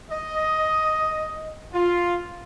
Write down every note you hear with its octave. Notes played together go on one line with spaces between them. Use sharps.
D#5
F4